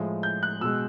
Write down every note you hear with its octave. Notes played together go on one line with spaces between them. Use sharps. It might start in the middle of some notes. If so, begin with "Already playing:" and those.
Already playing: A2 F3 G#3
G6
F#6
B2 G#3 E6